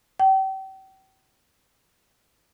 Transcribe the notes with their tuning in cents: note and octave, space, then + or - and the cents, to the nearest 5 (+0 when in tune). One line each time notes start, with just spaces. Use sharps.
G5 -35